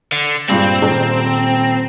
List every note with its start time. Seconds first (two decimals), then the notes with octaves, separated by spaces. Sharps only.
0.12 D3
0.49 G2 A#2 G#3 C4
0.82 D#1